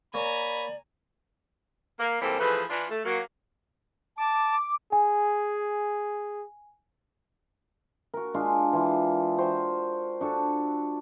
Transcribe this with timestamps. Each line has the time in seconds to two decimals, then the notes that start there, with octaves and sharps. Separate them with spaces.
0.14 A#3 C#5 D5 G#5 A#5 B5
1.99 A#3
2.22 G#2 E3 G3 A#3 C4 A4
2.39 E3 F3 A3 G#4 B4
2.70 E3 D4 F4
2.90 A3
3.05 F#3 A#3
4.18 A5 D6
4.92 G#4 G#5
8.14 F#4 A#4
8.34 G#3 D4 F4
8.73 E3 F4
9.38 F#4 C5 G5
10.21 D4 F#4 A4